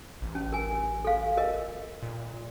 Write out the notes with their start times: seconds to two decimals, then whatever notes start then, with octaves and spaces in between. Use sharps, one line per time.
0.22 A1
0.35 C#4
0.53 A#4 G#5
1.04 A4 F5
1.37 A#4 D#5
2.03 A#2